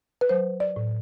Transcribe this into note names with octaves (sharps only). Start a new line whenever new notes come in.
B4
F#3 C5
D5
A2